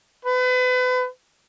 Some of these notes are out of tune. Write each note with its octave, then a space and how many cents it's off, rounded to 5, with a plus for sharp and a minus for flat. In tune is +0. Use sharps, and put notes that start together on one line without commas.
B4 +35